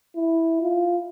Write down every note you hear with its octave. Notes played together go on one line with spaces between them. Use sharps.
E4
F4